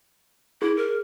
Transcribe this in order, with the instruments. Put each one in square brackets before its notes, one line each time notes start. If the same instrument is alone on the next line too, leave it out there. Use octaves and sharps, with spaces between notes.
[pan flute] E4 [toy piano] G#4
[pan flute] A#4